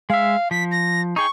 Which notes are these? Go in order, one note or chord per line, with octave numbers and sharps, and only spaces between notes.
G#3 E5 F5
F3 B6
A#6
D#4 G#4 G5 C#6